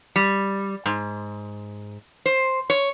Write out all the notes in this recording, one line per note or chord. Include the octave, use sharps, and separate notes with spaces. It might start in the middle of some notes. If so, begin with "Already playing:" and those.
G3
G#2
C5
C#5